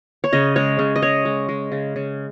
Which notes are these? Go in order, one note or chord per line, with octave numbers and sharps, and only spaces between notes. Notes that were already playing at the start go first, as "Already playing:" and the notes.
C#5
C#3 D#5
G#3 C#5
C#3
D#5
G#3 C#5
G#3
G#3
C#3
C#3